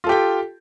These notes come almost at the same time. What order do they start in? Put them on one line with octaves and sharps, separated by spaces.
F4 A4 G4 G5